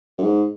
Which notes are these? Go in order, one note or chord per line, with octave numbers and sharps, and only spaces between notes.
F#2
G#2